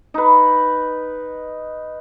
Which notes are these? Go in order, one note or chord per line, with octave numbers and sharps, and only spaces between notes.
D#4 B4